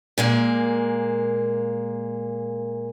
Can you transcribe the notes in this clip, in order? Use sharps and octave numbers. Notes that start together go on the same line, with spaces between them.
A#2 G#3 A#3